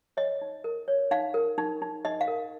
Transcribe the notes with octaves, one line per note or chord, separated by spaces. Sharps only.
C#5 D#5
D#4
A#4
C#5
D#4 F5
A#4
D#4
D#4
D#4 D#5
F5
A#4